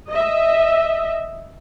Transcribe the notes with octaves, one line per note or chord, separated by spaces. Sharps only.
D#5 E5